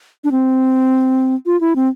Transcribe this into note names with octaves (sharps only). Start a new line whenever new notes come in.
D4
C4
F4
E4
C4